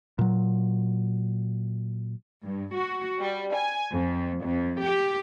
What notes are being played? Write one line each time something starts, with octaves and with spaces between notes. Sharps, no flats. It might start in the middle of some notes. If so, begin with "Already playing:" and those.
A#2 F#3
G2
F#4
G3
G#5
F2
F2
G4